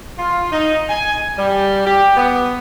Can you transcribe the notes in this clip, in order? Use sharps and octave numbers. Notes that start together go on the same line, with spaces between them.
F4
D#4
G#5
G3
G4
B3